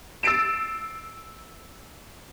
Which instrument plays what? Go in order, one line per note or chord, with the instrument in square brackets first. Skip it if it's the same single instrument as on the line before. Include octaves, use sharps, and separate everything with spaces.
[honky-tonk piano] E6 A6 C7 D7 E7